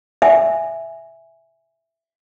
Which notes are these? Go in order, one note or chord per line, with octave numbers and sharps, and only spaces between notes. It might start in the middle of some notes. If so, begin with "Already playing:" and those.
E5 G#5